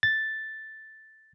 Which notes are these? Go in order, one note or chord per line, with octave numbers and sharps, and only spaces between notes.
A6